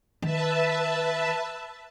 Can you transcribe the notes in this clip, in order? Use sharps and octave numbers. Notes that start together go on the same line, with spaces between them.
D#3 B4 E5 A5